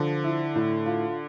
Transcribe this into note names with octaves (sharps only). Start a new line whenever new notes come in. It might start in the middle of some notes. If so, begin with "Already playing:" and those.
Already playing: D3 F3
E4
A2
F4